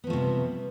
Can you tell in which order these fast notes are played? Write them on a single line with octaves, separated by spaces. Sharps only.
B3 F3 A3 C3 G3